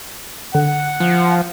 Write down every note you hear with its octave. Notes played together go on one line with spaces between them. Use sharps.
D3 F#5
F3